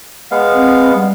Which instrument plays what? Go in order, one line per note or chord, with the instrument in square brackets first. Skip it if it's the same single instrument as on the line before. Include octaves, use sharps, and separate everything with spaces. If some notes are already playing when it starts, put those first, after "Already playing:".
[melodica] G#3 B3 F5
[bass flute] C4
G3